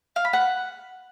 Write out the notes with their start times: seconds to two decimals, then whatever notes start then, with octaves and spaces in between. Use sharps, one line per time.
0.16 F5
0.25 B5
0.33 F#5